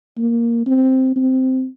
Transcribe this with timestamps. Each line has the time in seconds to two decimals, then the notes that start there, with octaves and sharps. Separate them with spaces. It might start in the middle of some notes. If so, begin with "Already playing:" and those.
0.18 A#3
0.66 C4
1.16 C4